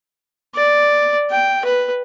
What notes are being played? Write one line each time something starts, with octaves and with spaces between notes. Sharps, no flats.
D5
G5
B4